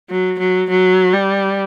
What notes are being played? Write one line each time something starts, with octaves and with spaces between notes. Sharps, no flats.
F#3
F#3
F#3
G3